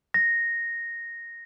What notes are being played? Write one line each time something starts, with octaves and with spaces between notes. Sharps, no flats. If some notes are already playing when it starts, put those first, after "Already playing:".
A#6